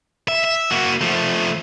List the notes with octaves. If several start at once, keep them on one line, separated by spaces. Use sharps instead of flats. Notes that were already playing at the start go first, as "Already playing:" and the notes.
E5
E5
A#3 F#4
F3 A3